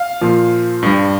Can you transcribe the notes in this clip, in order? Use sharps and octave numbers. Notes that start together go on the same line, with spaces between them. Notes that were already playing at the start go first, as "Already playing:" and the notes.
Already playing: F5
A#2 F3
G2 G3